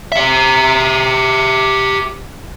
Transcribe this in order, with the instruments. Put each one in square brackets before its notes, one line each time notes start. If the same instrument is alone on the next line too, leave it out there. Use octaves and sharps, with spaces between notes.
[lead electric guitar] G4 E5